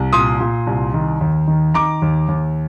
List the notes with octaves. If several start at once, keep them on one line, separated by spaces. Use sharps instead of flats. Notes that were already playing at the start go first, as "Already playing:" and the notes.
Already playing: C2
A#2 C6 D#6
A#2
C2
D#3
D#2
D#3
D#3 A#5 D6
D#2
D#2